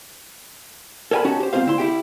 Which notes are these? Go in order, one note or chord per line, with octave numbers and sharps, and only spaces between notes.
A4 A#4 C#5 G5 G#5 B5
C#4 D#4 F#4 G4 A5
G4 C5
G#2 C4 F4 C5 F5
D2 E4 C6
E4 G4 G5